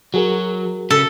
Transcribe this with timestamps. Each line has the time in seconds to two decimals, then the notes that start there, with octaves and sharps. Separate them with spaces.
0.14 F#3 F#4 G#4 A#4
0.90 C#3 A4